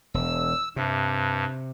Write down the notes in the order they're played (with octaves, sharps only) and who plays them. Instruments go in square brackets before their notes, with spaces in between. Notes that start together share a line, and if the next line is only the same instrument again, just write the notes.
[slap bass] E1 [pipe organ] E6
[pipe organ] G2 [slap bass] C3